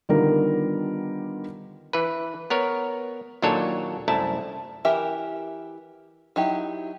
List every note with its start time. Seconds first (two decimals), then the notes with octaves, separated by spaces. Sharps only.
0.09 D3 D#3 G3 B3 F4 A#4
1.93 E3 B4
2.50 B3 A#4 C#5
3.42 D#2 A#2 F#3 D4 A4 C#5
4.08 C2 F#2 A3 E4 A5
4.85 E3 G4 A#4 E5
6.36 F#3 D#4 E4 G4